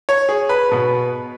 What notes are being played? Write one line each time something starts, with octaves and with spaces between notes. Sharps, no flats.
C#5
G#4
B4
B2 B3 B4